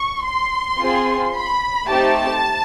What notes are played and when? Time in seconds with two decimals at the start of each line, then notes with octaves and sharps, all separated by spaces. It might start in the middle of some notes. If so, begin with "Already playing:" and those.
Already playing: C#6
0.24 C6
0.79 C4 F4 G#4
1.34 B5
1.89 A3 C4 D#4 G4 A5